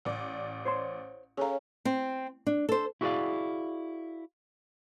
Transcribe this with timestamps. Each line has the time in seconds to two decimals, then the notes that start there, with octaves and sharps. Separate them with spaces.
0.05 A1 D5
0.65 C5 C#5 C6
1.37 C#4 G#4 A4 F5 A#5
1.85 C4
2.47 D4
2.69 A4 C5
3.01 E4 F#4 G#4 C5 D5 F5